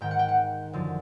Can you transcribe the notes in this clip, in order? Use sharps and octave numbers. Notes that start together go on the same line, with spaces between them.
G#2 D#3 G5
F#5
G5
F#5
F#2 D3 F3